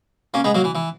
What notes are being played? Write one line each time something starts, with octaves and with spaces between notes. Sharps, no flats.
A#3 C#4
G#3 B3
F#3 A#3
E3
E3